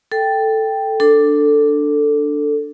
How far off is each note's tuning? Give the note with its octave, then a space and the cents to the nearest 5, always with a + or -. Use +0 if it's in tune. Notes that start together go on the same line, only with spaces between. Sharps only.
A4 +0 G5 +0
D4 +0 A4 +10